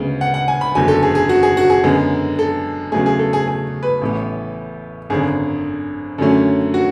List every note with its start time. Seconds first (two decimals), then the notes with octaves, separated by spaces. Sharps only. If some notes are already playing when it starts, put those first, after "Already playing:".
Already playing: D2 C#3 G#3 B3
0.21 F#5
0.34 F#5
0.48 G#5
0.61 B5
0.75 F#1 E2 D3 F#3 G#5
0.88 A4
1.03 G#4
1.15 G#4
1.29 F#4
1.43 G#4
1.57 F#4
1.70 G#4
1.84 F#2 D3 G#3 B3
2.39 A4
2.92 E2 C#3 F#3 A3 G#4
3.06 G#4
3.19 A4
3.33 G#4
3.48 G#4
3.83 B4
4.02 A1 A2 E3 B3
5.10 G#1 F#2 D3 G#4
6.18 F#2 D3 F#3 A3 C#4
6.74 F#4